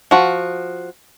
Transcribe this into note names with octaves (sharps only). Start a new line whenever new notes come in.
F3 F#4